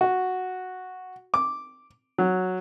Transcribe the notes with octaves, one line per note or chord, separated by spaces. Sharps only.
F#4
D6
F#3